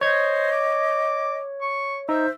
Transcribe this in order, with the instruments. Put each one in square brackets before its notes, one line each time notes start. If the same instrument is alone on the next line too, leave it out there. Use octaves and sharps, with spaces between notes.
[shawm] C5 [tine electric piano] C#5 G#6 [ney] D#5
[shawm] D6
C#6
[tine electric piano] D#4 [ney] C5 [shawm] E5